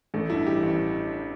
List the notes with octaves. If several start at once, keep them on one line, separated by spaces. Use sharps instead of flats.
A1 A3
G2 E4
E3 G4
A1